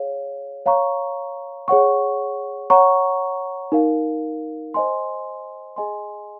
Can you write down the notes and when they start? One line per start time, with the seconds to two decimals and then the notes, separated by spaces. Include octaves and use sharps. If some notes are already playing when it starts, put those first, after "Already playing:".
Already playing: G#4 C#5 F5
0.66 C#5 F5 A#5 C#6
1.68 G#4 C#5 F#5 C#6
2.70 C#5 F#5 A#5 C#6
3.72 D#4 A#4 F5
4.74 C5 D#5 G#5 C6
5.76 G#4 D#5 G#5 C6